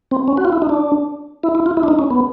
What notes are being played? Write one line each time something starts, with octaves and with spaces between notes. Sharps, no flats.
C4
C#4
F#4
F4
E4
D#4
D4
E4
E4
F4
E4
D4
D#4
C#4
B3